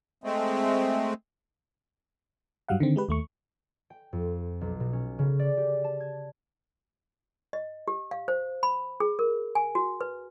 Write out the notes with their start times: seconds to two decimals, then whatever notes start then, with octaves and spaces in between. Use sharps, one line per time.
0.24 G#3 A3 C4
2.68 G2 F#3 G3 F5 F#5
2.80 D3 D#3 C4
2.96 G#3 G4 B4
3.09 D#2 A3 C#6
3.90 G5
4.13 F2
4.61 B1
4.80 B2
4.93 C#4
5.19 C#3
5.39 D5
5.57 G4
5.84 A5
6.00 G#6
7.53 D#5
7.88 G4
8.11 F5
8.28 C5
8.63 B5
9.00 G#4
9.19 A#4
9.55 G#5
9.75 F#4
10.01 B4